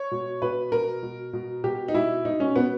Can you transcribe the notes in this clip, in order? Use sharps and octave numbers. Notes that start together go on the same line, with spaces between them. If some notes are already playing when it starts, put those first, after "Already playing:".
Already playing: C#5
B2
B2 B4
B2 A#4
B2
B2
B2 G4
D#4
B2 E4
B2 D#4
C#4
B2 B3